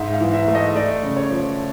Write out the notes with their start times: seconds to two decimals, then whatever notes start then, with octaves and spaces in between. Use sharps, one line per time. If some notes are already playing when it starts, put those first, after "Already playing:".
Already playing: G#2 E5
0.13 F5
0.21 E3
0.33 E5
0.47 A3
0.55 D#5
0.75 A3 D5
1.03 C#3
1.17 C#5
1.30 F3